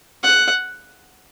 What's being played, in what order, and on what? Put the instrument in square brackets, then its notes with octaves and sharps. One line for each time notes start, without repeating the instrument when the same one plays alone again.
[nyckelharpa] F#5